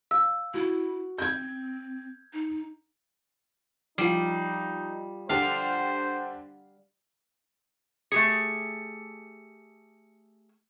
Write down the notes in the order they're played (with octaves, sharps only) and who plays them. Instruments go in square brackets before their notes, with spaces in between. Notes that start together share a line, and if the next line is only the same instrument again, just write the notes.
[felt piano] F5 [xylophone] E6
[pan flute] E4 [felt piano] F#4
[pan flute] C4 [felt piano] G6 G#6
[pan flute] D#4
[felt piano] F3 C7 [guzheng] G3 [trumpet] D#4
[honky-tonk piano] D3 D4 G4 [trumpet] C5 [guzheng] F5
[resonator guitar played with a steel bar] A3 G4 G#4 [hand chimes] C#7